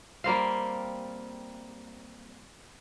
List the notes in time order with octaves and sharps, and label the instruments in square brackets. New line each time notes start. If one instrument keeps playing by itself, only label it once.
[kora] G3 A#3 C4 F5